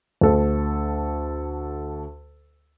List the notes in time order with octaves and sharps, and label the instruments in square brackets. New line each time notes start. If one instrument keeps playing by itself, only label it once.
[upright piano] D2 A4